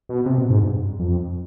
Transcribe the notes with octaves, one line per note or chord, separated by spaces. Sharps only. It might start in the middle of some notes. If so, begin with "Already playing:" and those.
B2
C3
B2
G#2
G2
F2